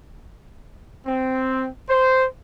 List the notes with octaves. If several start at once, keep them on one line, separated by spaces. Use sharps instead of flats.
C4
C5